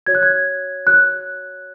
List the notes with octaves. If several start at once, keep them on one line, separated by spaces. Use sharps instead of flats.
F#4 C#5 G#6
F#6
G#6
F#4 C#5 F#6